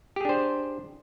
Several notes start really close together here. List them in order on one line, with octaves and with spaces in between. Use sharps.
G4 G#4 D4 C5